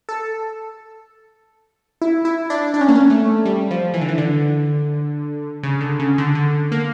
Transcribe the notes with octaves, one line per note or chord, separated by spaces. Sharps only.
A4
E4
E4
D4
D4
C#4
A#3
C#4
A3
G3
F3
E3
D3
E3
D3
C#3
D3
C#3
D3
D3
A#3